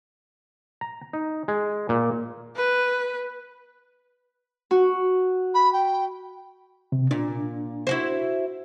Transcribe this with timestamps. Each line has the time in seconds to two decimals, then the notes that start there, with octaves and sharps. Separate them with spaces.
0.81 A#5
1.13 D#4
1.48 G#3
1.89 A#2
2.56 B4
4.71 F#4
5.54 B5
5.72 G5
6.92 C3
7.11 A#2 D4
7.87 E4 F#4 C5